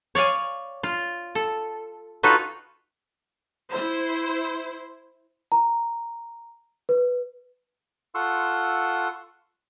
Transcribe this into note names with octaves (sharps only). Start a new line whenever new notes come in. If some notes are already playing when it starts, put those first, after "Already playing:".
C#5 D5 F5 G#5
F4
A4
D#4 F4 F#4 A4 B4
E4 C5
A#5
B4
F4 A4 F#5 C6 C#6 E6